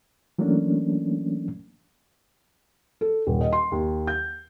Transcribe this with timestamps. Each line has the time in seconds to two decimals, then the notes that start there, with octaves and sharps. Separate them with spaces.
0.39 E3 F#3 A3 A#3 C#4 D4
3.01 A4
3.27 D#1
3.41 D#5
3.53 C6
3.72 D#2
4.07 G6